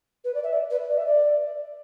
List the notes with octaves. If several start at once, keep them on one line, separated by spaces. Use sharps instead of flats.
B4
D5
E5
D5
B4
D5
E5
D5